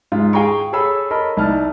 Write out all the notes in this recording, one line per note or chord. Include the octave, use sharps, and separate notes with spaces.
G#2 F4
G#4 F5 G5 G#5 A#5 C#6
G#4 A4 C#5 B5 E6
A#4 C#5 D#5 A5 B5
C2 D#4 A5 F6